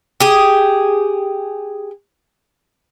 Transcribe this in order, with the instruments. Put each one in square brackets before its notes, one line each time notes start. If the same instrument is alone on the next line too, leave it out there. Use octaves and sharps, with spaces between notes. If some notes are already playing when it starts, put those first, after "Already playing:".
[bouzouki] G4 G#4